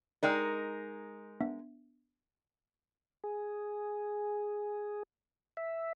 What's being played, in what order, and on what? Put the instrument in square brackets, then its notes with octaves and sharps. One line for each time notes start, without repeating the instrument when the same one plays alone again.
[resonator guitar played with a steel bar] G#3 D#4 A#4 [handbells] D5 G5 F6
[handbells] B3 D4 E5
[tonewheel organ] G#4
E5